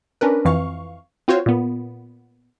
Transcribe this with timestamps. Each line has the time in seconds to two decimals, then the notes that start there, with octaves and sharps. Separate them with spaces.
0.21 C#4 D4 A#4 B4
0.45 F2 E3 F5 C#6
1.28 C4 F4 F#4 C5 C#5
1.46 A#2 B3